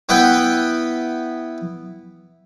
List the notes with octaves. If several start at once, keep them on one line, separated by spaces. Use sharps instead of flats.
B3 E4 B4 G5